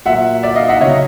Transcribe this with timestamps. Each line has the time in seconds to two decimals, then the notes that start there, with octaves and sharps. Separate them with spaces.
0.05 A#2 F#3 E5 F#5
0.43 D5 E5
0.55 D#5 F5
0.69 E5 F#5
0.81 C#3 F#3 C#5 D#5